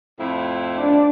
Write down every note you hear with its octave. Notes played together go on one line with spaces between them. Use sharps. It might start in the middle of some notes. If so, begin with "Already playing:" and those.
F2 A2 E4
D4